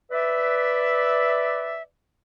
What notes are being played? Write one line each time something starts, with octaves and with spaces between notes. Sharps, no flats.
B4 D5 E5